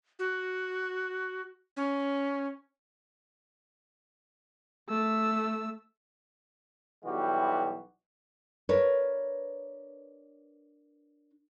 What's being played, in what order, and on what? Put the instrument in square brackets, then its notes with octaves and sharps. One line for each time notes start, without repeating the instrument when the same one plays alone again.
[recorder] F#4
C#4
[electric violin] A3 E6
[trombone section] B1 E3 G3 F#4 G4
[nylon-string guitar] D4 A#4 B4 C#5